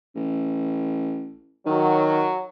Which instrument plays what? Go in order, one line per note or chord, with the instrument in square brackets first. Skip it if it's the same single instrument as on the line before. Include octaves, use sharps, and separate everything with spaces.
[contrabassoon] A1
[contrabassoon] D#3 [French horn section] F#3